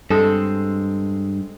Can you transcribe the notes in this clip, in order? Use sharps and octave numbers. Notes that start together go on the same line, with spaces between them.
G2 G#3 C4 A4